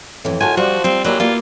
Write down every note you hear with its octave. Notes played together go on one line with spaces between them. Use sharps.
F2 A2 E3
D#3 G#3 F4 F#4 G#5 A5
F3 G3 F#4 D5 F5 C6
G3 C4 C5
F#3 A#3 E4 G4 G#4 A#4 D5
G3 A#3 B3 F4 F#4